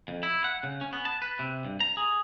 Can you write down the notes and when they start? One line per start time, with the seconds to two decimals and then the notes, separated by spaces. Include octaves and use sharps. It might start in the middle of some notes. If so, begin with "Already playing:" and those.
0.08 F2
0.23 E4
0.44 F#5
0.63 C#3
0.81 C#4
0.93 B3
1.05 A5
1.22 B4
1.39 C3
1.65 G2
1.80 A#5
1.97 G#4